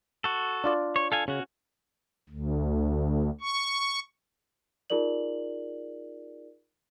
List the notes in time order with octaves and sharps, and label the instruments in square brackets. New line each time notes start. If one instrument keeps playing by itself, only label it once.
[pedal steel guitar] F#4 A4
[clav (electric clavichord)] D4 F4 D5
[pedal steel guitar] C#5
A4 F5 G#5
[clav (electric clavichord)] C#3 [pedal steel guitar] C#4 F#4
[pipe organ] D2
C#6
[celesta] D#4 F4 G#4 A#4 D5 F#7